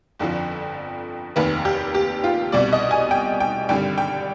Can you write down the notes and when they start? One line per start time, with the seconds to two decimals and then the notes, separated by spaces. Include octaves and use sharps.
0.19 G1 F2 D3 F3
1.36 F1 D#2 D#3 B4
1.65 G4
1.94 G4
2.24 F4
2.52 C2 B2 G3 D5
2.73 D#5
2.91 G#5
3.11 G5
3.40 G5
3.69 G#1 G2 D3 G3 G5
3.98 G5